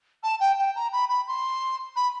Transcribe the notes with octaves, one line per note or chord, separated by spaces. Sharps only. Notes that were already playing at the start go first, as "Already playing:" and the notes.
A5
G5
G5
A#5
B5
B5
C6
B5